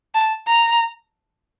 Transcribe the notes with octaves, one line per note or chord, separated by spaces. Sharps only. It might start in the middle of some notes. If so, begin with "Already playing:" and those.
A5
A#5